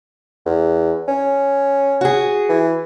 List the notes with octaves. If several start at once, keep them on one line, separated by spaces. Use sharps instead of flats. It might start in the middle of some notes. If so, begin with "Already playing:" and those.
E2
C#4
F#4 G#4
E3